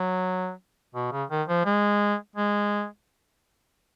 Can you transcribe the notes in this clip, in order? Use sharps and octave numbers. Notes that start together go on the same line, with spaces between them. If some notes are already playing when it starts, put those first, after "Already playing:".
Already playing: F#3
B2
C#3
D#3
F3
G#3
G#3